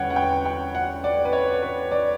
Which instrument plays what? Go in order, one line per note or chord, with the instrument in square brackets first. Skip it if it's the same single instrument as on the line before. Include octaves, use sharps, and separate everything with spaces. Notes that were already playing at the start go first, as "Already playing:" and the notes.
Already playing: [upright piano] E2 D3 G3 B4 C#5 F#5 G5
F#5
G5
G5
F#5
D5
B4
C#5
B4
D5